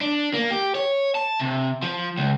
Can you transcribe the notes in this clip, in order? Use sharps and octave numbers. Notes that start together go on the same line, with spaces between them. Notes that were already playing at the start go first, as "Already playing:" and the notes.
D4
A#3
G4
C#5
A5
C3
F3
C#2